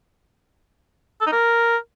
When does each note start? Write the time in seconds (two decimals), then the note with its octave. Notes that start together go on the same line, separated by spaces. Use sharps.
1.21 A4
1.27 D#4
1.32 A#4